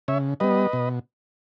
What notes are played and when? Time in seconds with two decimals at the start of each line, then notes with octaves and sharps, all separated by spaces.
0.08 C#3 C#5 E5
0.40 G3 B3 B4 D#5
0.73 B2